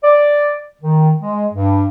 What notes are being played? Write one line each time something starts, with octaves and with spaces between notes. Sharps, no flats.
D5
D#3
G#3
G2